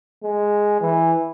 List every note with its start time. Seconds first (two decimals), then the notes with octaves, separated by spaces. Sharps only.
0.23 G#3
0.81 E3